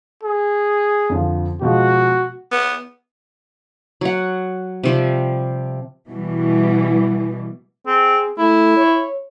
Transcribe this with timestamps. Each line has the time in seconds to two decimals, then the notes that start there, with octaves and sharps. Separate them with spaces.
0.24 G#4
1.10 F2 D3 F3
1.62 B2 F3 G#3 F#4
2.51 B3
4.01 F#3 F#5
4.84 C3 F3 G3
6.08 B2 E3 G3
7.87 C4 G#4
8.38 A3 E4
8.77 C#5